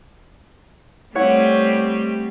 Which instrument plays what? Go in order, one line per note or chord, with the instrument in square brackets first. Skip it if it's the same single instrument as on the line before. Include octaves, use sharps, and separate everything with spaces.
[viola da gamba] G3 A3 C4 [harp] E4 C#5 F#5